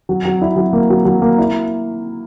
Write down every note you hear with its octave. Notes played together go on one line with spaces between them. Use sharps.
F#3
F#3
E4
F#3
A#3
F#3
F#3
A#3
E4